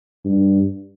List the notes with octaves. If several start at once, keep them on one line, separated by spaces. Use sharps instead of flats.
G2